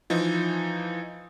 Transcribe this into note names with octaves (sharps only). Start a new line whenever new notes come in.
E3 F3 D#4